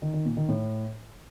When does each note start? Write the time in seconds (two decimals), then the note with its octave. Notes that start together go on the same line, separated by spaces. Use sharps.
0.02 D#3
0.14 D#3
0.25 A#2
0.37 D#3
0.48 A2